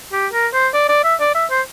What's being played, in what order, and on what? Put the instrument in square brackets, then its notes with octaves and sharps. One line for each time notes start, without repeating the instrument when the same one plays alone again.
[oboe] G4
A#4
C5
D5
D5
E5
D5
E5
C5